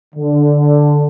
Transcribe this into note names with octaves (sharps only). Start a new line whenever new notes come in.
D3